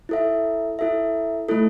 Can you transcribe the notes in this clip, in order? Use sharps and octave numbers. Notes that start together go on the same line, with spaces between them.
E4 A4 E5
E4 A4 E5
A3 E4 A4